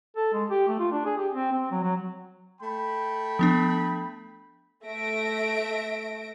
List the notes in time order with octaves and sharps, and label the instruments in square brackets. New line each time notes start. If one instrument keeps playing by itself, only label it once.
[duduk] A4
G#3
G4
A3
F4
D4
G#4
G4
C4
C4
F#3
F#3
[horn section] A3 G5 B5
[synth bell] F3 B3 D4
[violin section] A3 E5 A#6 D7